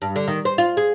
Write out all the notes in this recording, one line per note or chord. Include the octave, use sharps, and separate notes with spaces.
G2
D3
D#3
C5
F4
G#4